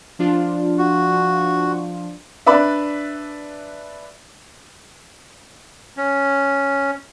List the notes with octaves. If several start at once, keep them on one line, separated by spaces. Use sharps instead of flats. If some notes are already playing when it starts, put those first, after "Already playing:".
F3 D4 F4
F#4
D4 B4 D5 E5
C#4